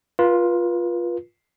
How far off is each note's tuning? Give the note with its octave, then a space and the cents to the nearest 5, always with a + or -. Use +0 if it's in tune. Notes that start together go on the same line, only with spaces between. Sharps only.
F4 +0 B4 -35